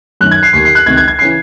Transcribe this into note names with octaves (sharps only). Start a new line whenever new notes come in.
F#2 D#3 F#6
G#6
C7
D#2 D#3 C7
C7
F#6
C#2 C3 D#3 G#6
G#6
G#6
C#3 E3 C7